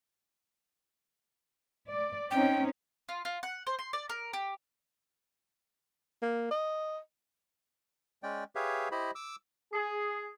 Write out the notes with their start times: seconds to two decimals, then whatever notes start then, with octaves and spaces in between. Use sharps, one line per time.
1.90 D5
2.31 C4 C#4 D#4 G5
3.09 F4
3.25 F4
3.43 F#5
3.67 C5
3.79 C6
3.93 D5
4.09 A#4
4.33 G4
6.22 A#3
6.51 D#5
8.23 G#3 C#4 D5 G5
8.55 G4 G#4 B4 C#5 E5 F5
8.92 E4 G4 C5 D#5 B5
9.15 D6 E6
9.73 G#4